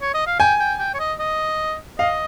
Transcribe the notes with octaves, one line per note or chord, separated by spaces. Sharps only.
C#5
D#5
F5
G5 G#5
G5
G5
C#5
D#5
D#5
D#5 F5